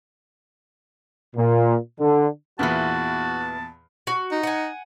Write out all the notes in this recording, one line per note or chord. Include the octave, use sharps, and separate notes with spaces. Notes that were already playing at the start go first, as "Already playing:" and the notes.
A#2
D3
E2 A#2 E3 B3 F#4 A5
F#4
D#4
F#5 G#5